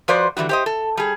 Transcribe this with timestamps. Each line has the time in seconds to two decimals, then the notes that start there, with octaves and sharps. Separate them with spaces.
0.08 F3 F#4 B4 C5 D5
0.37 D3 E3 G3 F#4
0.49 G4 C5 D#5
0.66 A4
0.97 G3 G#4